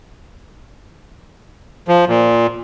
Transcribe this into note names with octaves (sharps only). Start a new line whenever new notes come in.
F3
A#2